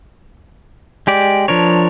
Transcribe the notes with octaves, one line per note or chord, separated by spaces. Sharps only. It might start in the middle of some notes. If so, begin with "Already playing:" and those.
G#3 G4 D5
F3 D4 A#4 C#5